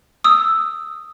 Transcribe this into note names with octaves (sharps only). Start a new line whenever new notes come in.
D#6 E6